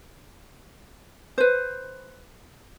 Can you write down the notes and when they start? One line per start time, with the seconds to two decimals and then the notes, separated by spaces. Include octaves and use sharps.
1.38 B4 C5